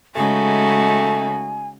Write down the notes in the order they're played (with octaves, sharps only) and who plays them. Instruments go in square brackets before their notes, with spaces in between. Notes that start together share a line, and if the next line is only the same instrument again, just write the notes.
[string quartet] C#3 D#4 [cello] G#3 F#4 [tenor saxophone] A3 [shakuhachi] G#5